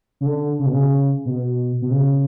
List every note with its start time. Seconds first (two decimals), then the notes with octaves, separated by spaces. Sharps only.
0.21 C#3
0.26 D3
0.59 C#3
0.66 B2
0.73 C#3
1.25 B2
1.82 B2
1.91 C#3